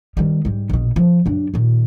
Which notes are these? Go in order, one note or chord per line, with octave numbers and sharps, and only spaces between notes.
D#3 G3
G#2 G3
A#1 B2
F3
F#2 D4
A#2 D#3